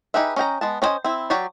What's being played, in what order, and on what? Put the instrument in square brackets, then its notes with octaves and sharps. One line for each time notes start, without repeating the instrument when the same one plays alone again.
[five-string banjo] D#4 G4 G#4 B4 E5
C#4 D#5 G5 A#5
G#3 B3 A5
C#4 D4 C5 D#5 G#5
C4 E4
F#3 F#4 G4 C#5 D5